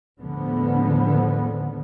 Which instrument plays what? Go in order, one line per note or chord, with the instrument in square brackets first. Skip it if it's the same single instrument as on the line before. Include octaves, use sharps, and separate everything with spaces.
[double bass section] D#2 A2 D3 F3 G#3 B3